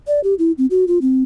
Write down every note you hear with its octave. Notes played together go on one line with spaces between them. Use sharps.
D5
G4
E4
C4
F#4
F4
C4